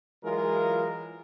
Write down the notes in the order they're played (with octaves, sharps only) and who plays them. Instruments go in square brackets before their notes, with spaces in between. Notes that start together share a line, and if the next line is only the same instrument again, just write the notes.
[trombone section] E3 F#3 G#3 F4 A#4